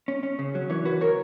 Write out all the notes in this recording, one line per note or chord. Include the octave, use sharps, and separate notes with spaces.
C#4
C#4
C#3
F#3
E3 C#5
F#4 B4
A#4 C#5